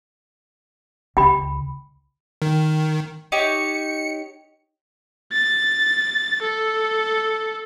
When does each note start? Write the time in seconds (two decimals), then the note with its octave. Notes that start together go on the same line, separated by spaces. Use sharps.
1.17 C#2 G5 B5
2.42 D#3
3.32 D#4 G4 C#5 C#7
5.33 A6
6.42 A4